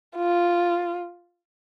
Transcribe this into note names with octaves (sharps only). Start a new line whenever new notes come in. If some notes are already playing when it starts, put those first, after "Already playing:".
F4